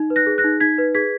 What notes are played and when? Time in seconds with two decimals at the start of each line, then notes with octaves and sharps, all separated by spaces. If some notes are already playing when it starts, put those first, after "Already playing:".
Already playing: D#4
0.10 B4
0.16 F#6 A#6
0.26 G#4
0.38 F#6 A#6
0.44 D#4
0.60 D#4 G#6 B6
0.78 B4
0.95 G#4 G#6 B6